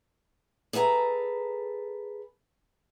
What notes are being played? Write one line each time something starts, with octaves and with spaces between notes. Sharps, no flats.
G#4 A4 B4 F5 A#5